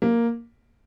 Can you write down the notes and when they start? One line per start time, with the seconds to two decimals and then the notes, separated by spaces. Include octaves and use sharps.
0.02 A#3